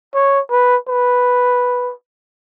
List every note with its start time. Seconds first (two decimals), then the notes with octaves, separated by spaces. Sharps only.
0.14 C#5
0.51 B4
0.89 B4